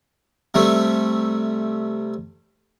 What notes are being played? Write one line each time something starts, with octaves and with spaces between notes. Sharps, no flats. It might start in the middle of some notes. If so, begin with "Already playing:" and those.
C3 G3 A3